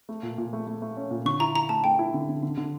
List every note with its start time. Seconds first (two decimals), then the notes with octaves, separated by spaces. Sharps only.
0.09 A3
0.23 A#2
0.38 A#2
0.53 A3
0.67 A3
0.82 A3
0.97 C#4
1.11 A#2
1.25 D3 C#6
1.40 E4 A#5
1.56 E4 A#5
1.69 A3 A5
1.84 A3 G5
1.99 E4
2.14 D3
2.29 D3
2.43 D3
2.57 D3